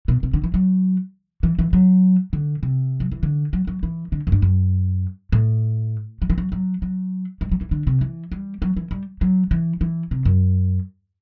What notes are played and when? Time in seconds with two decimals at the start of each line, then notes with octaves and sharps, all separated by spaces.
0.08 B2
0.23 C3
0.33 D3
0.44 E3
0.54 F#3
1.43 E3
1.59 E3
1.73 F#3
2.33 D3
2.63 C3
3.00 F#3
3.12 E3
3.23 D3
3.53 F#3
3.67 F#3
3.83 E3
4.12 D3
4.27 F#2
4.32 G2
4.42 F#2
5.32 A2
6.22 F#3
6.30 E3
6.38 F#3
6.52 F#3
6.82 F#3
7.41 G3
7.51 F#3
7.61 E3
7.71 D3
7.87 C3
8.01 E3
8.32 G3
8.62 F#3
8.77 E3
8.91 G3
9.21 F#3
9.51 E3
9.81 E3
10.11 C3
10.25 F#2